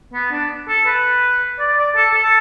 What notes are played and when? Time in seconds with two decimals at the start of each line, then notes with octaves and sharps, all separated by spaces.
0.13 B3
0.31 D4
0.68 A4
0.86 B4
1.59 D5
1.78 D5
1.96 A4
2.14 A4